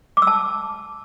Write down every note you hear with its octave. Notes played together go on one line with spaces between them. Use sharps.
D6
E6
A5